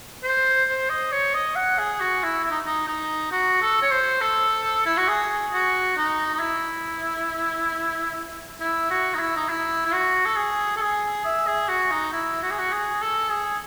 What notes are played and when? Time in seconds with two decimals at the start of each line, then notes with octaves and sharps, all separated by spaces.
0.23 C5
0.68 C5
0.89 D#5
1.12 C#5
1.34 D#5
1.56 F#5
1.78 G#4
2.00 F#4
2.23 E4
2.44 E4
2.51 D#4
2.66 D#4
2.88 D#4
3.32 F#4
3.62 A4
3.82 C#5
3.91 C5
4.21 A4
4.86 E4
4.97 F#4
5.08 G#4
5.53 F#4
5.97 D#4
6.35 D#4
6.40 E4
8.60 E4
8.91 F#4
9.15 D#4
9.19 E4
9.37 D#4
9.49 E4
9.85 E4
9.93 F#4
10.25 A4
10.36 G#4
10.77 A4
10.81 G#4
11.25 E5
11.47 G#4
11.69 F#4
11.91 D#4
12.13 E4
12.43 F#4
12.51 G#4
12.59 F#4
12.72 G#4
13.02 A4
13.31 G#4